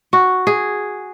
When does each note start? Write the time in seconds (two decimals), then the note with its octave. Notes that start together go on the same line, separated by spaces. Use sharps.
0.13 F#4
0.47 G#4